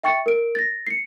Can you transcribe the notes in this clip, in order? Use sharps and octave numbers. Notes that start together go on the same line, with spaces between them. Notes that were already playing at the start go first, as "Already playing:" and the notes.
E5 G5 C#6 A6 C#7
A#4 D7
A6 A#6
C7 C#7